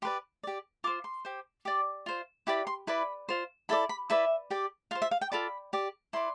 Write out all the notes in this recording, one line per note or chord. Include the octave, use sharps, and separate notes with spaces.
G4 B4 D5 C6
G4 D5
F4 C5 D6
C6
G4 C5
G4 D5 D6
F4 C5
E4 G4 B4 D5 D6
C6
E4 B4 D5 B5
F4 C5
E4 A4 D5 B5
B5
E4 B4 D5 E5
G4 D5
F4 C5 F5
E5
F5
G5
F4 A4 D5 B5
G4 D5
E4 B4 D5 C6